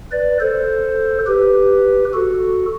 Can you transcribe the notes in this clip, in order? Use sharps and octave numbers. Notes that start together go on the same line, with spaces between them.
B4 D5
A4 C5
G4 B4
F#4 A4